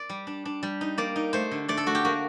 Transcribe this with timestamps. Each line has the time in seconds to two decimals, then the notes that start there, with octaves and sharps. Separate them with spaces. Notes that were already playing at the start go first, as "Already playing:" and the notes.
Already playing: D5
0.09 G3
0.27 D4
0.45 D4
0.63 G3
0.81 D#4
0.98 A#3 D5
1.16 D#4
1.33 A3 C5
1.51 D3
1.68 A3 D5
1.77 A4
1.86 A3 F#4
1.95 G4
2.05 A#3 F#4